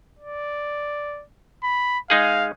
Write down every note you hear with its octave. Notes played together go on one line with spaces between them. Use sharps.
D5
B5
G#3 D#4 G#4 F5